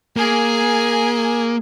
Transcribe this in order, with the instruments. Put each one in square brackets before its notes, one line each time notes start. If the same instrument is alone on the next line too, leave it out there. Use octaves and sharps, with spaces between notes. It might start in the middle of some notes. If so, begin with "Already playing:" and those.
[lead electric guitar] A#3 [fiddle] G#4 G#5